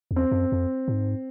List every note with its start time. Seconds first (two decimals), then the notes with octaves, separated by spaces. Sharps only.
0.11 E2
0.16 C4
0.32 F#2
0.52 F2
0.88 A2
0.93 G#2